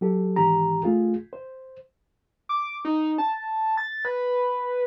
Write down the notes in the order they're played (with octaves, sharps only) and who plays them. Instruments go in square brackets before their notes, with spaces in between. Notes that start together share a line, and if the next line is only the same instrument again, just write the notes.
[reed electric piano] F#3 G4 A4
G#2 D#3 E3 G4 A#5
A3 F4 G#4
C5
[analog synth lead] D6
D#4
A5
A6
B4